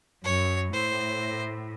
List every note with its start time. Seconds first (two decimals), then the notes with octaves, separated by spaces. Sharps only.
0.24 F#2 C#5
0.73 A2 C5